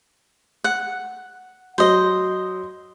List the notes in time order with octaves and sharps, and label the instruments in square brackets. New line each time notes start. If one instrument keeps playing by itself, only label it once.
[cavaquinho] F#5
[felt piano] F#3 [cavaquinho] C5 D#5